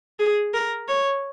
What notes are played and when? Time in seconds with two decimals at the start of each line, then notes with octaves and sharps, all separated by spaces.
0.19 G#4
0.54 A#4
0.88 C#5